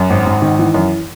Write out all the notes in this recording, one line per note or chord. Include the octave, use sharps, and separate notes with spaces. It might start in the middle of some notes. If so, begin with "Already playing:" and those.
Already playing: F#2 F#5
G#1
G#1
D#3
E3
F#2